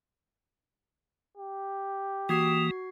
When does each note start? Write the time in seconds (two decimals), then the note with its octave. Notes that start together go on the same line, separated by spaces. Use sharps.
1.37 G4
2.29 E3 A#3 F#4 D#6 G#6 C7